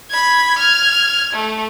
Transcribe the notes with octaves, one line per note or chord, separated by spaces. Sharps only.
B5 G#6
F6 G#6
A3